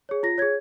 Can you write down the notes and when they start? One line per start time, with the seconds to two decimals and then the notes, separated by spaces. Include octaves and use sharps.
0.09 G#4 C#5
0.23 F4 A#6
0.38 G#4 C#5 G#6